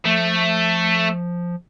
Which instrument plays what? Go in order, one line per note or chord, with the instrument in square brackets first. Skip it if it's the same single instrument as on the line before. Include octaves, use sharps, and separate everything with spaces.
[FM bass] F3 [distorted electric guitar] A3